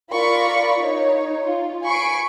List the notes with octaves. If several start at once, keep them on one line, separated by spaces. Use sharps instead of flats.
F4 A#4 D5 F5 B5 C#6
D#4 C#5
F4
G#5 B5 C#6 C7 D7